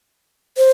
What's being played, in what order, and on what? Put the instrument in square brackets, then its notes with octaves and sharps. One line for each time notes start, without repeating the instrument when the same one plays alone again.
[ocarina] C5